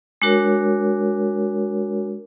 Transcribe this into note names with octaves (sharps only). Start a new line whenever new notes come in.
G#3 D4 F#4 A#4 C#5